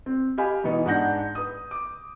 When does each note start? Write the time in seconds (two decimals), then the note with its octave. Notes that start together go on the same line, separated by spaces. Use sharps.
0.06 C4
0.38 G4 D#5 F5 G#5 B5
0.64 B2 E3 B3 D#4
0.86 G#2 D4 F#5 G6 A#6
1.35 B4 D#6
1.71 D6